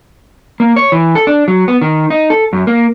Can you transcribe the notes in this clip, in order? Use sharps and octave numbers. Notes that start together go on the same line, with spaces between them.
A#3
C#5
E3
A4
D4
F#3
B3
D#3
D#4
A4
F#2
A#3